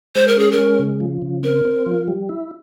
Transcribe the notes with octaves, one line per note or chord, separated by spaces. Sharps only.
G#3 C5
A#4
C#4 G#4
A#4
G#3
C#3
F3
C#3
C4 A#4
C4
F3
G3
E4